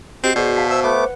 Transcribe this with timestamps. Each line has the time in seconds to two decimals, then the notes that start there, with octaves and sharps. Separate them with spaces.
0.23 C4 F#4 G4 D#5 C7
0.36 B2 G#4 C5 D5
0.57 F5 A5 B6
0.71 C5 E5 E6
0.84 A3 B3 F#5 D6
0.99 B4